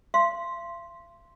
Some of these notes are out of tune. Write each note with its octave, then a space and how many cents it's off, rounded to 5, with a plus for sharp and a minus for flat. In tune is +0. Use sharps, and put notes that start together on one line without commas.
F5 -45 C6 +0